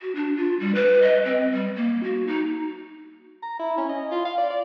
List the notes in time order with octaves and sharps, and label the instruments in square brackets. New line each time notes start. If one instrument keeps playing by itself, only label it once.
[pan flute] F#4
D4
F4
G3
B4
D#5
C4
G3
A#3
F#4
D#4
[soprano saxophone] A#5
E4
C#4
D#5
F4
F5
D5
D5